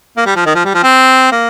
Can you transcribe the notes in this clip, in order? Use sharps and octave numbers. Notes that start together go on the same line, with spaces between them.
A#3
G3
F3
D#3
F3
G3
F3
C4
A#3